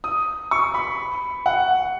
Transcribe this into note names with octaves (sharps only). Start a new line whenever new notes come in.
D#6
C#6
B5
F#5